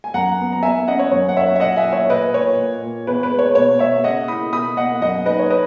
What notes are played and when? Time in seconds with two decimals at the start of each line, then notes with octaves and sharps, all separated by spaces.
0.04 G#5
0.14 F#2 F#5 A#5
0.39 B3
0.52 A#5
0.63 E2 E5 G#5
0.88 C#4 D#5 F#5
0.99 C#5
1.12 F#2 C#5
1.29 F#5
1.37 F#2 C#5 E5
1.55 E5
1.60 A#2 D#5 F#5
1.76 E5 G#5
1.85 A#2
1.93 C#5 E5
2.09 A#2 B4 D#5
2.34 A#2 C#5
2.58 A#2
2.82 A#2
3.07 E2 B4
3.23 B4
3.32 G#3
3.39 C#5
3.55 B2 C#5
3.79 B2 C#5 E5
4.04 C#3 D#5 F#5
4.28 E4 B5 D#6
4.52 B2 B5 D#6
4.77 B2 D#5 F#5
5.01 F#2 D#5 F#5
5.26 D#4 B4 D#5
5.39 C#5
5.50 B4 D#5